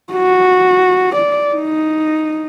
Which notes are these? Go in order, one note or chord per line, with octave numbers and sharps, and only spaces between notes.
F#4
D5
D#4